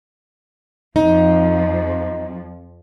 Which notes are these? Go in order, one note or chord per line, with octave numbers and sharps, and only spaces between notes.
F2 F3 D#4